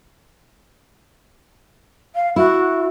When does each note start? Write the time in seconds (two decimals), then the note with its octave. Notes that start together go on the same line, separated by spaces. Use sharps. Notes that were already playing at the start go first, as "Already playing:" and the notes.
2.15 F5
2.36 E4 F#4